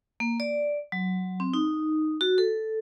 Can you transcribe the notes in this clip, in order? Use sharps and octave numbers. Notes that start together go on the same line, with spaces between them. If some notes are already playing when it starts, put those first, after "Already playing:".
A#3
D5
F#3
C4
D#4
F#4
A4